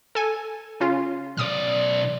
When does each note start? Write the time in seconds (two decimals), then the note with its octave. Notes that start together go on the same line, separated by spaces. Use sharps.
0.15 A4 G#5
0.80 C#3 C#4 F4
1.37 B1 D5 D#6 F6